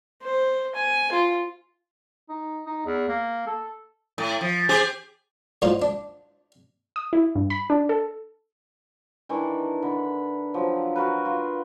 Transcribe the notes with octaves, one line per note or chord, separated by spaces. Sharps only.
C5
G#5
F4
D#4
D#4
E2
A#3
A4
A2
F3
G4 G#4 C5
A2 G3 D#4 F4 F#4 C5
D4
D#6
E4
G2
B5
D4
A4
D#3 E3 D4
D3 B4
F3 F#3 G4
F#4 A#4 B4
F4